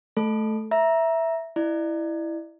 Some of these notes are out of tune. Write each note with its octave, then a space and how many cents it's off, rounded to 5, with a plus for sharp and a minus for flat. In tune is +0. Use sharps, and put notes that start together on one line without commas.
A3 -15 A4 -5
E5 +0 A#5 +20
E4 +0 D5 +35